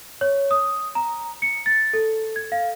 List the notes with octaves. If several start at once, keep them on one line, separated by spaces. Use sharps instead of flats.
C#5
D#6
A#5
C#7
A6
A4
G#6
F5